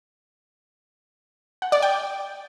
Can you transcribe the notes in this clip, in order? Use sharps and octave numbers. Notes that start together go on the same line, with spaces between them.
F#5
D5
G5